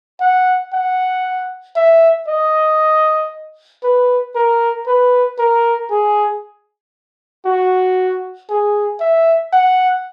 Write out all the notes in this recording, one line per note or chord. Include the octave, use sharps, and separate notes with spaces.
F#5
F#5
E5
D#5
B4
A#4
B4
A#4
G#4
F#4
G#4
E5
F#5